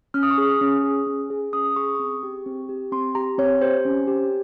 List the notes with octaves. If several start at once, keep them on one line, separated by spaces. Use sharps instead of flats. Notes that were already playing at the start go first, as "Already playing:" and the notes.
C#4 F6
D#6
C#6
G#4 D#6
C#4
G#4
C#4
G#4
C#4 D#6
G#4 C#6
D#6
C4 C#6
G4
C4
G4
C4 C6
G4 A#5
C4 C#5
G4 C5
C#4
G4